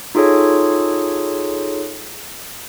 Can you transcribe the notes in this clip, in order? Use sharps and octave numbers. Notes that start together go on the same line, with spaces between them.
D#4 F4 G#4 A4 C#5